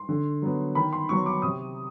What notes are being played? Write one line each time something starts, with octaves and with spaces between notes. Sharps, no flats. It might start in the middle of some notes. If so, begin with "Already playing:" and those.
Already playing: C6
D3
F#3 B3
D#3 B5
C6
F#3 B3 C#6
D6
C3 D#6